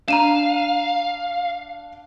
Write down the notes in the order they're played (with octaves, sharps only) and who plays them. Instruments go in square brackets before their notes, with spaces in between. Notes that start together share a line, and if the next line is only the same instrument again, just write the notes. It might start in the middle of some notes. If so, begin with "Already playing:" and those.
[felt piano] D4 [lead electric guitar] F5 [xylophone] A#5 D#7 E7